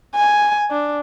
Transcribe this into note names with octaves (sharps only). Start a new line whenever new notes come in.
G#5
D4